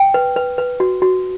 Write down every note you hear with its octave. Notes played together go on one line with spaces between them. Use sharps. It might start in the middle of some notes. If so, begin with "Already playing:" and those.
Already playing: G5
B4
B4
B4
F#4
F#4